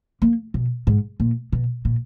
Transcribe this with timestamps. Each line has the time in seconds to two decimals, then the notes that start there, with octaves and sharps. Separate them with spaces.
0.22 A#3
0.54 B2
0.87 G#2
1.20 A#2
1.53 B2
1.85 A#2